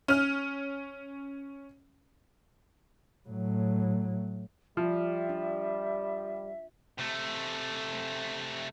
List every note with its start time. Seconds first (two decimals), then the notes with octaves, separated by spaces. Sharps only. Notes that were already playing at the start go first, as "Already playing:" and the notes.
0.08 C#4 F6
3.29 A2 F#3
4.77 F3 G3 F4 E5
5.29 D4
6.99 C3 A3